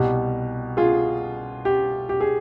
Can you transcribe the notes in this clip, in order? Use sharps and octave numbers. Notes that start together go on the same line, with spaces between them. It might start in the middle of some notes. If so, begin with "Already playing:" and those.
Already playing: C2 B2 G3 G4
F4 G#4
G4
G4
G#4